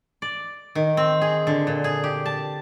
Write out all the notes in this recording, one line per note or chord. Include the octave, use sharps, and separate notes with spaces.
D5
D#3
C4
G#4
D3
A#2
G#4
G4
A5